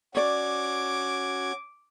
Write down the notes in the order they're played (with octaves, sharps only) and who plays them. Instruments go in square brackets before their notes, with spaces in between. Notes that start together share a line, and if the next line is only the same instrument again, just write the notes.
[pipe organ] C#4 F#4 G#6 [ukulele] C#5 D5 [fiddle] D6